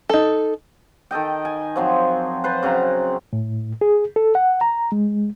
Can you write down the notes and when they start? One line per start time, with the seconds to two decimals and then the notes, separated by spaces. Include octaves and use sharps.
0.09 D#4 A4
1.11 D#3 A4 D#5 G5
1.45 G#5
1.76 F3 F#3 C4
2.44 B4 C5 A5
2.63 C#3 F#3 C4 A#5
3.33 A2
3.81 G#4
4.16 A4
4.35 F#5
4.61 A#5
4.92 G#3